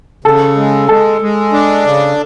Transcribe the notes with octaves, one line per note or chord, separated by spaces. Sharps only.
C#3 A4
G#3
G#3 A4
G#3
D4
C#3